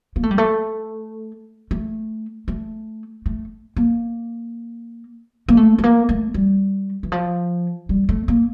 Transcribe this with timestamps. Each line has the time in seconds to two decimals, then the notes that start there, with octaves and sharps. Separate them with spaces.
0.16 A#3
0.23 A3
0.31 G3
0.38 A3
1.71 A3
2.48 A3
3.26 A3
3.76 A#3
5.48 A#3
5.57 A3
5.78 A3
5.84 A#3
6.09 A3
6.34 G3
7.03 E3
7.12 F3
7.89 G3
8.09 A3
8.28 A#3